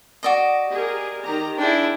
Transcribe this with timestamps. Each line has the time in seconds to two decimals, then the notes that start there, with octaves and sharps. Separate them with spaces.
0.23 F#4 D5 D#5
0.70 G4 G#4 A#4
1.23 D#3 G4 A#5
1.58 D4 E4 G#4 G5